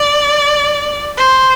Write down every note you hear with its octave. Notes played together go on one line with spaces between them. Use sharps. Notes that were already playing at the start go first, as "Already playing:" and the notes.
Already playing: D5
C5